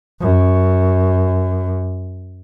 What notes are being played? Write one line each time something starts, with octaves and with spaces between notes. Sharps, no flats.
F#2